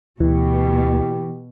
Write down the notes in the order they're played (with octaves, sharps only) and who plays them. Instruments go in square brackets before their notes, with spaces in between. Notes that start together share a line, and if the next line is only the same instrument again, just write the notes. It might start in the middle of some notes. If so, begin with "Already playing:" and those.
[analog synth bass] D2 [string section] B2 [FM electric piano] E3 [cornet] G4